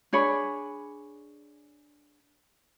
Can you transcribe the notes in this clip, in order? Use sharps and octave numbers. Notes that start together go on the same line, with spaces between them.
D4 G#4 C#5 B5